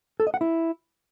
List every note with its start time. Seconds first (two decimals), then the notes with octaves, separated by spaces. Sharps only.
0.20 A4
0.27 D#5
0.34 F#5
0.41 E4